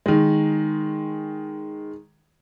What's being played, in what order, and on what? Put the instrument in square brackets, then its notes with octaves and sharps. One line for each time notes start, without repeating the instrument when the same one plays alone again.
[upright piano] D#3 G#3